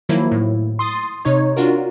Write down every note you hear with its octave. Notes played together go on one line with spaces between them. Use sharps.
D#3 F3 F#3 A#3 E4
A2
C6 D#6 A6
C3 D#4 C#5
D4 F4 F#4 A#4